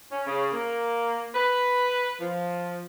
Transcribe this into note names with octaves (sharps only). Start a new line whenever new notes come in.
C#4
C#3
A#3
B4
F3